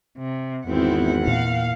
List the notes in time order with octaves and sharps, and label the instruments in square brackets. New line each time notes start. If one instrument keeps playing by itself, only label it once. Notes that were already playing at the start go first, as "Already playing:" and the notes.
[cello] C3
[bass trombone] G#1 [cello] E2 F#5 [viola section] B3 C4 E4
[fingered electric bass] A#2 [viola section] F5